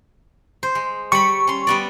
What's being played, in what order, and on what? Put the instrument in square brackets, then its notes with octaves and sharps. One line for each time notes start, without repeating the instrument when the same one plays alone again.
[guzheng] C5
G#3
[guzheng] G3 B5 [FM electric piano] C#6
[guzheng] C#4 C6
G3 B3 D5